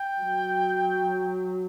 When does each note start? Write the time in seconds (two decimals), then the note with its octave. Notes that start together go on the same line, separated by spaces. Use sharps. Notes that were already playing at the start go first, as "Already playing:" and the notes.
Already playing: G5
0.20 F#3